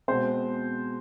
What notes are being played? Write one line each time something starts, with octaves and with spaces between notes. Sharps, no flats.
B2 G#3 C4 C5